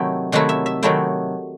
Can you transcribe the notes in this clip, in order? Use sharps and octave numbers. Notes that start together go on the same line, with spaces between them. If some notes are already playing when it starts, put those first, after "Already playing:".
Already playing: C3 D#3 F#3 A3 E4 G5
C3 D#3 F#3 A3 E4 F#5
E5
E5
C3 D#3 F#3 A3 E4 G5